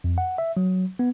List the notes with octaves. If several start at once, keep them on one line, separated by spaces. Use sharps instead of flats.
F2
F#5
E5
F#3
B3